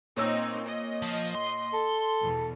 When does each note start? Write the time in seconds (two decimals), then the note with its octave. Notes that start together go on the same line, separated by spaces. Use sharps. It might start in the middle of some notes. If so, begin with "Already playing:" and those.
0.17 A#2 A#3 C4 D#4 C#5 E6
0.66 D#5
1.02 F3
1.35 C6
1.73 A4
2.20 E2 B2